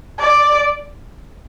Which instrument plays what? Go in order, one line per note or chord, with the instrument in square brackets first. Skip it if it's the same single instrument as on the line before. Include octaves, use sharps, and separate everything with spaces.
[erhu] D5